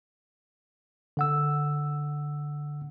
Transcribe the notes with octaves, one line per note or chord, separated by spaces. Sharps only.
D3 F#5 E6